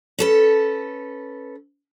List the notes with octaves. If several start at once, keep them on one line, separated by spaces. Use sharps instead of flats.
C#4 A4 B4